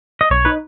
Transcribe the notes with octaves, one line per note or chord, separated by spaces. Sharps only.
D#5
B1 C#5
D#4 B4